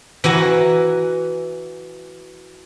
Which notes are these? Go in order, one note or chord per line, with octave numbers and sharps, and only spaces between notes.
E3 F#4 G#5 A#5